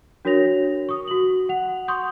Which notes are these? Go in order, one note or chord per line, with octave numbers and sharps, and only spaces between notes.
D4 F#4 A#4 C#5 A#6 F7
C#6 D#6
F#4 F#7
F#5 F7
C6 C#6 D#6 G6